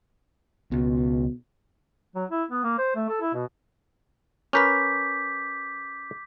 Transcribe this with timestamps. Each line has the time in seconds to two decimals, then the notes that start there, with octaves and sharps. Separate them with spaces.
0.72 C#2 B2
2.15 F#3
2.31 E4
2.51 B3
2.63 A#3
2.78 C5
2.95 A3
3.09 A4
3.21 E4
3.34 B2
4.53 C#4 A#4 B4 D6 G6 B6